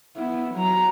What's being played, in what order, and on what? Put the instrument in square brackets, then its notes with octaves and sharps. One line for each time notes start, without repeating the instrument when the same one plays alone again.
[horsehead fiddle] B3 E4
F#3 A#5